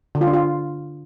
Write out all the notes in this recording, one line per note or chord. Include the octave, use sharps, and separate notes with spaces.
D3
F4
D4
F4